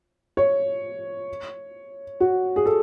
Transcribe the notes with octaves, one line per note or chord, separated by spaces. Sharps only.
C#5
F#4
G#4
A4